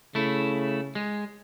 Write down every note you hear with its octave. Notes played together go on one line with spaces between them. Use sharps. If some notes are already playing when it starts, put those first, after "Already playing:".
C#3 A3 E4
G#3